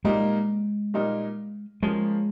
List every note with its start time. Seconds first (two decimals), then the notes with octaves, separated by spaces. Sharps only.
0.05 A#2 G3 G#3 A#3 D#4 A#4
0.94 A#2 G3 A#3 D#4 A#4
1.83 F3 G#3 A#3 C#4 G#4